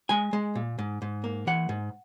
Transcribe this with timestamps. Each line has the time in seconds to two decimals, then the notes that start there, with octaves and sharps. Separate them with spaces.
0.09 G#3 G#5
0.33 G#3
0.55 A#2
0.78 G#2
1.02 G#2
1.24 A#3
1.47 E3 F#5
1.69 G#2